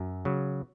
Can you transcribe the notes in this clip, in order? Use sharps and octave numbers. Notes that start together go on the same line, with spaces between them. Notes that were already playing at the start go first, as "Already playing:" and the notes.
Already playing: F#2
C#3 F#3